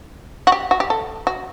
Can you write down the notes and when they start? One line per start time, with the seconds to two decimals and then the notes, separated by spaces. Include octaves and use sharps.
0.47 F#4
0.52 G4
0.71 F#4
0.80 G4
0.90 A4
1.27 F#4